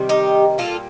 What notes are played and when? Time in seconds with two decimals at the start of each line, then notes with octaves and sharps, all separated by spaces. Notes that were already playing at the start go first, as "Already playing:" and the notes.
Already playing: C3 D#3 G3
0.09 D#4 G4
0.58 A#2 G3 F4 A4